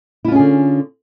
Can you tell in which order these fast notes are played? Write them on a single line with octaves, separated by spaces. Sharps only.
E4 F4 C#4 G#4 D3